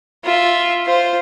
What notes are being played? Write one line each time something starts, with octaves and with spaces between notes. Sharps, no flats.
F4 E5
F4 C5